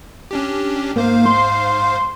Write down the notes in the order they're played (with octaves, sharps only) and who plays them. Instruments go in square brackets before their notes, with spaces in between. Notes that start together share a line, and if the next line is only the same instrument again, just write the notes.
[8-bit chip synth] C#4 D4 G4
[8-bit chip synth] G#2 C5 F5 [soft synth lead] A#3
[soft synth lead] C6